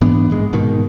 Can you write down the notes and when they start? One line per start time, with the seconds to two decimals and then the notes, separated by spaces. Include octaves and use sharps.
0.01 G#2 E3 B3 D4
0.30 A#1 G#2 G#3
0.53 G#2 B2 D#3